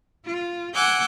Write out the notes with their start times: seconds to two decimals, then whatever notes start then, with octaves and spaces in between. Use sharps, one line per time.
0.24 F4
0.74 F#5 G#5 D6 E6 F#6 G6